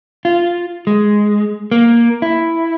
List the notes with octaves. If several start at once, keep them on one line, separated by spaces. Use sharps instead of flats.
F4
G#3
A#3
E4